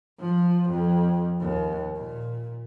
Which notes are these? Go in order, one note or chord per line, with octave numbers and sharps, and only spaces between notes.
F3
F2
D#2
A#2